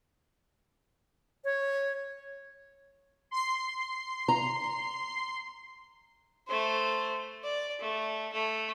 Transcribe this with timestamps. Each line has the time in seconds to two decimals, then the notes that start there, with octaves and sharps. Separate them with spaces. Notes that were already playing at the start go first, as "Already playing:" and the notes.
1.44 C#5
3.31 C6 C7
4.28 A#5
6.47 A3 C5
7.44 D5
7.80 A3
8.33 A3